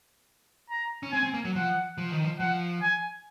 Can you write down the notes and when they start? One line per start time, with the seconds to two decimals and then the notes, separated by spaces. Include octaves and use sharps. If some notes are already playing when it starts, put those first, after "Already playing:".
0.70 A#5
1.03 C#4
1.12 C4 G#5
1.23 C4
1.34 A#3
1.45 F#3
1.55 F3 F#5
1.98 F3
2.11 D#3
2.24 F3
2.40 F3 F#5
2.83 G#5